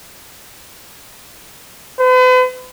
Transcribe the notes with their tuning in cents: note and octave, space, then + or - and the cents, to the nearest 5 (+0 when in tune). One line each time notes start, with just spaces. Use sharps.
B4 +45